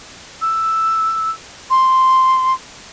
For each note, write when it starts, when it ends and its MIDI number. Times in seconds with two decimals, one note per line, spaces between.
0.42 1.31 88
1.70 2.53 84